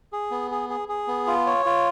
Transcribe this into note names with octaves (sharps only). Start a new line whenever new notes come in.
G#4
B3
G#4
G#4
G#4
B3
F4
C#5
F4